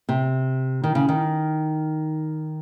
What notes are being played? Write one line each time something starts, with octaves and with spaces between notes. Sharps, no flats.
C3
D#3
C#3
D#3